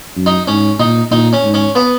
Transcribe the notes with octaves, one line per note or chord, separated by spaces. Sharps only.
F#2
D#4
G#2 C#4
A#2 D#4
A#2 D#4
C#4
G#2
C#4
B3